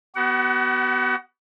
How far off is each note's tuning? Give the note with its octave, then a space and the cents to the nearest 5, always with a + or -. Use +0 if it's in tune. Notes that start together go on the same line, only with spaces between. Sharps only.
B3 +0 F#4 +45 F#5 +25